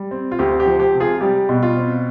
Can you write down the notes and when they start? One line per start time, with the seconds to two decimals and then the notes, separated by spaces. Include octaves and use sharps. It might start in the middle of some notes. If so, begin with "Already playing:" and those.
Already playing: G3
0.11 C4
0.32 F4
0.39 D2 G4
0.60 G4
0.66 F3
0.80 G4
0.94 C3
1.00 F4 G#4
1.21 G3 G4
1.49 B2
1.62 F4
1.77 C4